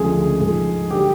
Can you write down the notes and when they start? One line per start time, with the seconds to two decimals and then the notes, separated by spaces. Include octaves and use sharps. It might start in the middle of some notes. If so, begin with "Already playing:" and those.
Already playing: D2 C#3 F3 G#3 G#4
0.40 G#2 F3 G#3
0.90 D3 F#3 G4